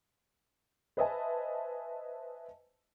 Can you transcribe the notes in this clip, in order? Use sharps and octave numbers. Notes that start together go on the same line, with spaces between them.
B4 C5 D#5 E5 G#5 A5